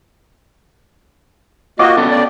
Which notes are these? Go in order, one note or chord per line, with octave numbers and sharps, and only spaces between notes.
A#3 F4 F#4 D#5 G5 D6
D3 B3 C#4 A4
D5